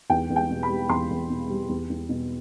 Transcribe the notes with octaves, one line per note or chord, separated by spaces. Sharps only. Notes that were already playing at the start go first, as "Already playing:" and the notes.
E2 G5
E2
G5
B2
B5
G3
E2 C6
E2
B2
G3
E2
E2
B2